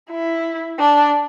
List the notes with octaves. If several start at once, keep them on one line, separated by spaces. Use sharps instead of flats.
E4
D4